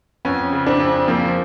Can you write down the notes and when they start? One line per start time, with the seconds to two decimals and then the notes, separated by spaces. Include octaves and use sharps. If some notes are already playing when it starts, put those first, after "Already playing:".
0.25 F2 B3 C#4
0.53 C#3
0.66 C4 D4
0.80 F2
1.08 F3 A#3 C4